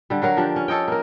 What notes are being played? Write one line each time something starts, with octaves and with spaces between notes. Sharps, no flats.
D3 G3
F#3 F#4 A#4 F5
F3 D4 G4
C#4
A4 C#5 D#5 G5
A#3 A#4